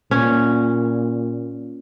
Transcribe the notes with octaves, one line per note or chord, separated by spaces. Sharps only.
A#2 C#4